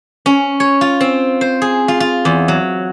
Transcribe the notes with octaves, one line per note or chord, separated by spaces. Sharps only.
C#4
C#5
F4
C4
C5
G#4
F4
F4
E2
F#3